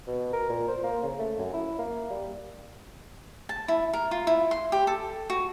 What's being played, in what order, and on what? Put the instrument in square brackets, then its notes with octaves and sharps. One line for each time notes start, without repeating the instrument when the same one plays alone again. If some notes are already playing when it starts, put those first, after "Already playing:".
[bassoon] B2
A#4
A#2
C5
A#3
C#3
A3
F#2
E4
A#3
G3
[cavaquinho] A5
E4
A#4
F4
E4
C6
G4
A4
F#4